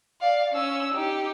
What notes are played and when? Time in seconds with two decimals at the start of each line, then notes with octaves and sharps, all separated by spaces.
0.21 D5 F5
0.52 C#4 E6
0.94 D#4 G4